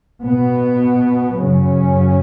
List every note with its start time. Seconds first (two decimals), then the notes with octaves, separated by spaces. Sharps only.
0.24 B2 B3
1.37 F#2 C#3 F#3 C#4